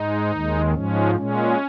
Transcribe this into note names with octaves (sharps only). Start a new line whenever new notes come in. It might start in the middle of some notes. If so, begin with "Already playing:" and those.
Already playing: G#2 G#3 D#4
D#2 D#3 G#3
G#2 F3 G#3 C#4
A#2 G#3 C#4